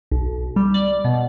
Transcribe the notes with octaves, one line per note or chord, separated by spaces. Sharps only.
B1
G3
D5
B2